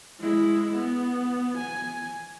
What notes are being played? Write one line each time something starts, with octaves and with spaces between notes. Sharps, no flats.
G#3 E4
B3
G#5